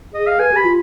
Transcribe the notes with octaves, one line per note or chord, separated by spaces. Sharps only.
G#4 D#5
F5
B4 G#5
G4 B5
F4